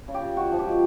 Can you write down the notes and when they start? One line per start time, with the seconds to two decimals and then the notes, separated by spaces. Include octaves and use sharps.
0.08 C#3
0.14 G4
0.22 C#3
0.37 G#3 F#4
0.51 F3
0.59 G4
0.67 G#3